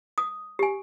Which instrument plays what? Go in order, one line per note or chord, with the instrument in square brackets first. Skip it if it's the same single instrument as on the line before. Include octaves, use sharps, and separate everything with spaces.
[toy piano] D#6
G4 G#5